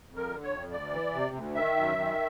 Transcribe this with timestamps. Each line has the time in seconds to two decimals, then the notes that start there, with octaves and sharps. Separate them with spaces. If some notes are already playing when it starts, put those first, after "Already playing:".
0.09 F2
0.16 A#4
0.30 D3
0.44 C#5
0.50 F2
0.71 D2 D5
0.93 E3
1.14 C3
1.35 D2
1.55 D#3 E5
1.76 F#2
1.97 D#3